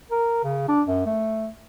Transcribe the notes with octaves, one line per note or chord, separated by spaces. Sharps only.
A#4
C#3
D4
F#2
A3